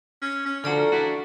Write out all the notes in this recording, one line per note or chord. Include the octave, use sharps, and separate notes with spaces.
C#4
C#4
D3 F3 F#4 A4 D5 A#5
E3 D4 F#4